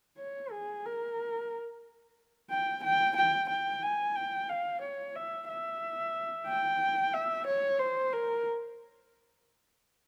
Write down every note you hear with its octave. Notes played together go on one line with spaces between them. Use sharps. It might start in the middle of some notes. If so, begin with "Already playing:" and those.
C#5
G#4
A#4
G5
G5
G5
G5
G#5
G5
F5
C#5
E5
E5
G5
E5
C#5
C5
A#4